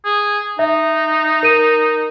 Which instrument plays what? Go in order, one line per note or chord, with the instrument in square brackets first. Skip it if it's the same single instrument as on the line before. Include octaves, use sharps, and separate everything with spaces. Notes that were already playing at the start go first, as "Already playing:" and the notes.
[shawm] G#4
[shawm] D#4 [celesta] E5
[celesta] A#4 D#7